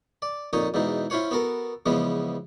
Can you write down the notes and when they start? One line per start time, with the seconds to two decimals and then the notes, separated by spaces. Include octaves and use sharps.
0.22 D5
0.53 F2 A#2 D#4 C#5 D#5
0.74 E2 G#2 B2 D#4
1.10 C#4 E4 F4 C5 C#5 F#5
1.31 B3 F#4 A4 A#4
1.86 E2 C#3 F3 G#3 B3